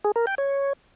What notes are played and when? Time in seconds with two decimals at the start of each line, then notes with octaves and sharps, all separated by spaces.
0.04 G#4
0.16 A#4
0.27 G5
0.38 C#5